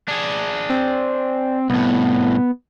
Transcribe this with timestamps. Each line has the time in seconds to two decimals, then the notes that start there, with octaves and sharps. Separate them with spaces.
0.08 D4 G#4
0.70 C4
1.70 C2 A2 B3